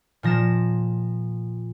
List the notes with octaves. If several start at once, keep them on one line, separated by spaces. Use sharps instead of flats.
A#2 F3 A#6 E7